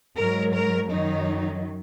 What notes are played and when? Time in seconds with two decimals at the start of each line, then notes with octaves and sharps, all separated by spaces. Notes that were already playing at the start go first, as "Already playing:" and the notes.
0.16 G#2 F#3 A#4
0.53 A#4
0.89 F#2 D#3 F#3 D#4